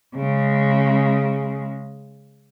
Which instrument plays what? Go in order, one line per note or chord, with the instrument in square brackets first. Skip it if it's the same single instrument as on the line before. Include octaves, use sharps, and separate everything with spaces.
[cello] C#3 G#3